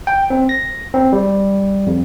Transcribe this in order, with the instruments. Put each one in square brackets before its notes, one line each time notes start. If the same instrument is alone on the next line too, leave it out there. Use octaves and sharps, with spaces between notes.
[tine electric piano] G5
C4
A#6
C4
G3
F2